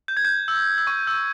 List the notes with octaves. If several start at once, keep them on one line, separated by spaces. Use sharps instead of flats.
G6
G#6
G6
E6
E6
C#6
E6